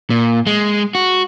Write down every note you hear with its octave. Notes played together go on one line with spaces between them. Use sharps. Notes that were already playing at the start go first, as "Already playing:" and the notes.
A#2
G#3
F#4